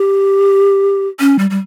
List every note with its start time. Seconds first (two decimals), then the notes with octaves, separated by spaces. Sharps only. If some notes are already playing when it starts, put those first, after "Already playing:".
Already playing: G4
1.20 C#4
1.39 G3
1.50 G3